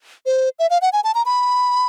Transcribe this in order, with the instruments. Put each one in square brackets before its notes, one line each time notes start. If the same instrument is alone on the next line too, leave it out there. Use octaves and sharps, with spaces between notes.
[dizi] C5
E5
F5
F#5
G#5
A5
A#5
B5